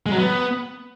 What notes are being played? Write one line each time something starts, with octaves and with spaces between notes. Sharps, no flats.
G#3
F#3
B3